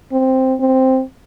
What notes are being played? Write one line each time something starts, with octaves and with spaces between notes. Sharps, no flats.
C4
C4